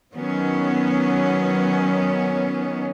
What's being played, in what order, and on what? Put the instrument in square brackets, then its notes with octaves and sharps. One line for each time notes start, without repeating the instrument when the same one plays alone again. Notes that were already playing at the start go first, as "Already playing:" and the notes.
[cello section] D#3 F#3 B3 C#4